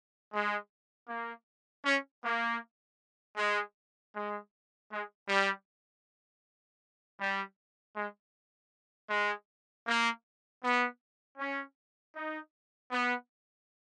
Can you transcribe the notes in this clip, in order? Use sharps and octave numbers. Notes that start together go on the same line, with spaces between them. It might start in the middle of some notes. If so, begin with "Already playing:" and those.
G#3
A#3
C#4
A#3
G#3
G#3
G#3
G3
G3
G#3
G#3
A#3
B3
C#4
D#4
B3